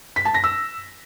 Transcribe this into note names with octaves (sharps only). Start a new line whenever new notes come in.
B6
A5
A#6
E6